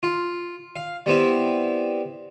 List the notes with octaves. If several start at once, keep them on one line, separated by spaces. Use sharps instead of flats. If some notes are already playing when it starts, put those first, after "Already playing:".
F4
F5
G3 B3 C4 E4